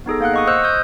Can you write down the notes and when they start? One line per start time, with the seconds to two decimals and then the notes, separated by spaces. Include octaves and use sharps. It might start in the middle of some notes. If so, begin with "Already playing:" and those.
0.06 B3 D#4 G#4 A4
0.21 A#3 F5 F#5 F#6
0.34 D#5 C#6 D#6
0.47 C5 D#5 E6 F#6 G6
0.64 D#6 G6